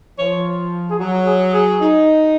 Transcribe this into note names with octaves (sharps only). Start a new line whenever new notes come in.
F3 C#5
G#4
F#3 F#4
G#4
G#4
D#4